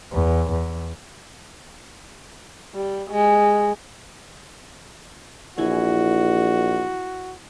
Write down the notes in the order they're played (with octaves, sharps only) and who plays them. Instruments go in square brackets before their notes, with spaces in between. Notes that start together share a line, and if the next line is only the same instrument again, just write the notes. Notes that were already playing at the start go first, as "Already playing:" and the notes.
[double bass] E2
E2
[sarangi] G3
G#3
[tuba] A#1 [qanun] E3 E4 G#5 [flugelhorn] F#4